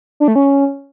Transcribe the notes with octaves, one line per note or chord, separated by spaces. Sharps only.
D4
A3
C#4